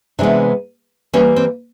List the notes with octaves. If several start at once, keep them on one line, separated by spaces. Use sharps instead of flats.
C3 E3 G#3 B3 D4
E3 G3 A#3 C#4
C4